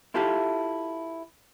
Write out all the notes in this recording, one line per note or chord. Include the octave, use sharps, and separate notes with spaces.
E4 F4 G4 A4 E5 F5